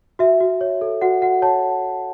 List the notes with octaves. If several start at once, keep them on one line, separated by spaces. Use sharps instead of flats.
F#4 E5
F#4
C#5
A4
F#4 F#5
F#4 F#5
C#5 A5